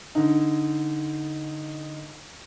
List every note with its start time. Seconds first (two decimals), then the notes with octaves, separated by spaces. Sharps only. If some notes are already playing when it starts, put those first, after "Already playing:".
0.15 D3 D#4